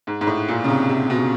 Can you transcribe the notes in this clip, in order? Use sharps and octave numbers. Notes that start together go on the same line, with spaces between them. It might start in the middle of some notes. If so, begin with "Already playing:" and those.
G#2
G#2
A2
A#2
C#3
C3
C3
B2